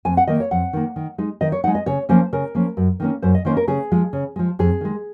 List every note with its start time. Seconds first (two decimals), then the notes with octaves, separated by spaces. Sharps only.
0.05 F2 G#5
0.17 F#5
0.27 D#3 A#3 D#5
0.40 C#5
0.51 F2 F#5
0.73 D#3 A#3
0.96 D#3
1.18 G#3 D#4
1.41 D#3 D#5
1.52 C#5
1.64 D#4 F#5
1.68 G#3
1.75 D#5
1.86 C#3 C#5
2.09 F3 A#3 C#4 C5
2.33 C#3 A#4
2.55 F3 A#3 C#4
2.77 F#2
3.00 D#3 A#3 C#4
3.22 F#2 C5
3.35 D#5
3.45 D#3 A#3 C#4 C5
3.57 A#4
3.68 C#3 G#4
3.92 F3 G#3
4.13 C#3
4.36 F3 G#3
4.59 F2 G#4
4.81 D#3 G#3